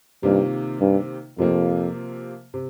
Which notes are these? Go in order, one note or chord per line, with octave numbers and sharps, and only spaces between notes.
G2 C3 D#3 A#3 F4
G2
F2 C3 F3 A#3 F4
C3